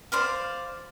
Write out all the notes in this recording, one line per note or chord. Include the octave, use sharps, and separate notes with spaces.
C5 D5 F5